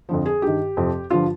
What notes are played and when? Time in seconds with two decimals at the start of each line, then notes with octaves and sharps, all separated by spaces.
0.09 F2 D3 F3
0.26 G#4
0.42 G2 D#3 G4
0.77 F2 C3 F3
1.10 G2 D3 F3 F4